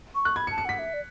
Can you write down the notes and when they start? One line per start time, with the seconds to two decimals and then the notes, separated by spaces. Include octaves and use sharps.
0.15 C#6
0.25 F#6
0.36 B5 G#6
0.47 C#7
0.51 A5
0.58 C#7
0.65 F#5 B6
0.79 E5
0.94 D5